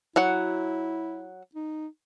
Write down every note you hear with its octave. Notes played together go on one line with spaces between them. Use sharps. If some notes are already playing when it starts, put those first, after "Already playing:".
F#3 E4 F#4 F#5
D#4